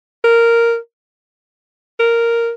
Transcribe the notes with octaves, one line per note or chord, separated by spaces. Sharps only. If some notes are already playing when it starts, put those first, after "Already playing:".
A#4
A#4